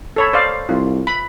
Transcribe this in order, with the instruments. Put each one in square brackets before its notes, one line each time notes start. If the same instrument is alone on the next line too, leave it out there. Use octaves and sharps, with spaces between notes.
[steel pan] A4 C#5 B5
C5 D5 F5
[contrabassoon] C2 [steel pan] F4
[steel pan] B5